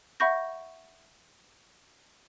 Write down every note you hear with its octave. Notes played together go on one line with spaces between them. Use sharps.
E5 F#5 B5 C#6 G6 A#6